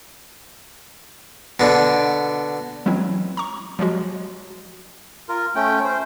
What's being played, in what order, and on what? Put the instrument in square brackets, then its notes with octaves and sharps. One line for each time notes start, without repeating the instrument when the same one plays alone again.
[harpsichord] B2 D3
[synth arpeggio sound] E3 F#3 G#3 C4 C#4 E4
A#5 C#6
F3 F#3 G#3 F#4
[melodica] F4 A#4
A3 C#4 G5
C5